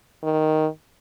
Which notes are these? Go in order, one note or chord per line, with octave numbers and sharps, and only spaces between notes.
D#3